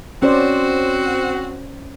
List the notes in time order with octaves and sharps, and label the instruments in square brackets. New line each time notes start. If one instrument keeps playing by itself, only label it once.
[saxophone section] C4 F#4 [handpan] C#4 C5 D5